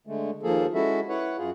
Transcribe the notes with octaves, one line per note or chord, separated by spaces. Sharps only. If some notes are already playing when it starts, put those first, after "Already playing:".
D3 G#3 A3
D#2 F3 A#3 G#4 A4
G#3 C#4 E4 F#4 A4 E5
E4 B4 C#5 F#5
F#2 F4 G#4